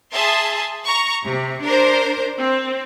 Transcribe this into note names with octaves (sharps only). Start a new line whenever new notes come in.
G#4 E5 A5 C6
A#5 C#6
C3
D4 A#4 C5
C4